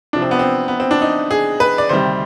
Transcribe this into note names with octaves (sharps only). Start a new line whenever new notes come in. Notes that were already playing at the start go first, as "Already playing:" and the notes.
C2 C3 F3 D4
C4
B3
C4
B3
C4
D4
D#4
G#4
B4
D5
D2 C3 D#3 G3 C5